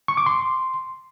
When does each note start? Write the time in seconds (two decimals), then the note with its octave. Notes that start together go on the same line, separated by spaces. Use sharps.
0.08 C#6
0.17 D6
0.26 C6